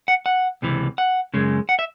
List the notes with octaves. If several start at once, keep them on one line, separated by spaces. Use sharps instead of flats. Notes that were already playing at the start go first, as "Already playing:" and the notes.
F#5
F#5
C#2 C3 E3
F#5
F#2 C#3 G#3
F#5
E5